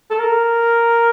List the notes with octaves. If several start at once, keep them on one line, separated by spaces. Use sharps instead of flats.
A4
A#4